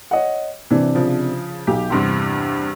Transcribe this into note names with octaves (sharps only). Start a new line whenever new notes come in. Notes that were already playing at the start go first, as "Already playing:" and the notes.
C#5 D#5 F#5
C3 E3 D4
C#3 F3
B1 G4
E2 G2 C3 C6